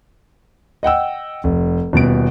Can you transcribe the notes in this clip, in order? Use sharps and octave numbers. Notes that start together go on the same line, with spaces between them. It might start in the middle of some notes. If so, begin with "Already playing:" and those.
D#5 F#5 G5 E6
F1
D#1 B2 D7